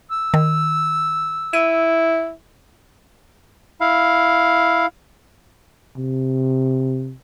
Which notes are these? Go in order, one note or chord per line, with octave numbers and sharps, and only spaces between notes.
E6
D#3
E4 D#7
E4 F5
C3